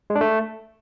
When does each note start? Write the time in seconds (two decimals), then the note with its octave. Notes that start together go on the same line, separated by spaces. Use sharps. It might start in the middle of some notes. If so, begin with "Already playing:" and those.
0.10 G#3
0.15 D4
0.21 A3